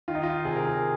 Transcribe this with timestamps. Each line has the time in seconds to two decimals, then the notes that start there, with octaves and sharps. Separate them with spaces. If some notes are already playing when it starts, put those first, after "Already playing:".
0.08 D#3 F4
0.15 D#4
0.23 F4
0.45 C3 G#4
0.56 A#4
0.66 G#4